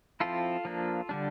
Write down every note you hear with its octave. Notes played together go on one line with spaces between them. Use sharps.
F3 C4 E4 F4 A4
F3 A#3 D4
D3 G3 D4